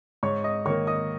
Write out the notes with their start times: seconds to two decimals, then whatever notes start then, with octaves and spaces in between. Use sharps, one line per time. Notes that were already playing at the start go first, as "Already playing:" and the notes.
0.23 G#2 C#5 C#6
0.44 D#5 D#6
0.65 D#3 A#3 C#5 C#6
0.87 D#5 D#6